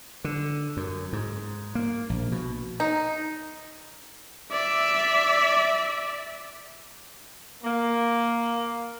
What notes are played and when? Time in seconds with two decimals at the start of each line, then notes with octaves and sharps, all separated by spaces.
0.24 D3
0.77 F#2
1.13 G#2
1.75 A#3
2.10 A#1
2.32 B2
2.80 D#4
4.51 D5 E5
7.63 A#3